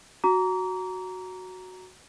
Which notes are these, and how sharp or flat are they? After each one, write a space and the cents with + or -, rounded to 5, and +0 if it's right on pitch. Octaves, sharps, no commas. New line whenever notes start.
F#4 +0 A#5 +0 D6 -40